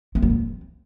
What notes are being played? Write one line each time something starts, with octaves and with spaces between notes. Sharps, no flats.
C4
F#3
C4